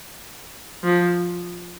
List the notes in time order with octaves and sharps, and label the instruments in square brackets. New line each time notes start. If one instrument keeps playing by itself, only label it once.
[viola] F3